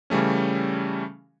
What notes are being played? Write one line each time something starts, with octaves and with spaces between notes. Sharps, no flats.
C#3 E3 G3 A3 C#4